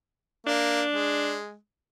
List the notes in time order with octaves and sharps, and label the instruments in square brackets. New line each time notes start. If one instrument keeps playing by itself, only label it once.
[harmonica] A#3 [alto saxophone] D4
[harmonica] G#3